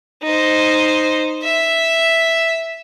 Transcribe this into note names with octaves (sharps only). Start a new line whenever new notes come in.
D#4 C5
E5